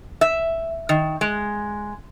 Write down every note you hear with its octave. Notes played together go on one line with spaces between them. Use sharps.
E5
D#3
G#3